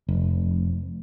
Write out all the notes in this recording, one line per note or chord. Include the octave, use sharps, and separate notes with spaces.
F1